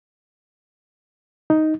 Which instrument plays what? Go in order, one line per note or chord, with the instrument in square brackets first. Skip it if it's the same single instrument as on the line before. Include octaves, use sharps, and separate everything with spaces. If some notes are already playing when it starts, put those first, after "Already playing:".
[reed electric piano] D#4